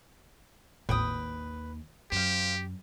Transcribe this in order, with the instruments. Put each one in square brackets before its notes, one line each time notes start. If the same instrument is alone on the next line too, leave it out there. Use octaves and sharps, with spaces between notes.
[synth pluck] G#1 A2 [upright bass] D#2 [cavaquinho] B4 G5 D#6
[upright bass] F#2 [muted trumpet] G4 [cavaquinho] C5 F5